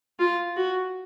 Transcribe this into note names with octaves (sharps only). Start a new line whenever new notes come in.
F4
F#4